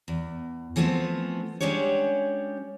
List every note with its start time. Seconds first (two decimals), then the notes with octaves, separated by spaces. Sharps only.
0.08 E2
0.76 E3 F3 A3 B3 C4
1.60 F#3 G#3 C#4 D4 G4 C#5